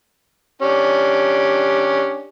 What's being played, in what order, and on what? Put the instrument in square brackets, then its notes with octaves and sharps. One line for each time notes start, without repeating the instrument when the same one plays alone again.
[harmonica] C#4 D4 G4